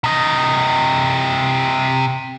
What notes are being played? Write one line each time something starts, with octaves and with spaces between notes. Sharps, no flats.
C3 D#5